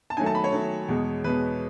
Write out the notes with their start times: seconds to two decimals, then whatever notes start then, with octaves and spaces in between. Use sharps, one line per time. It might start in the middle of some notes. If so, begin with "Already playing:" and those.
0.10 A5
0.17 D#3 F#3 A3 G#5
0.26 A5
0.35 B5
0.44 C#5
0.53 D#3 F#3 A3
0.88 E2 B2 G#3
1.24 E2 B2 G#3 B4